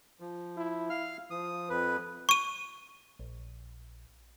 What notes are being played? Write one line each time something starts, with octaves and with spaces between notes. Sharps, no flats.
F3
E4
F5 F6
F3 D#6
F2 B4
C#6 D#7
A#1